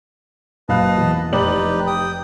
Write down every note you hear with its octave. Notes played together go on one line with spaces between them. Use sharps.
F#1 B4 D#5 F5 A5 F#6
E2
F1 D#4 G4 B4 D5 F#7
G5 D#6